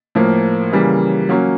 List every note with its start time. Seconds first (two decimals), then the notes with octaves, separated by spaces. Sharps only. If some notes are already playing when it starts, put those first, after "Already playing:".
0.15 A2 F3 A#3
0.72 C#3 E3 G3 A#3
1.29 F#3 A#3 C#4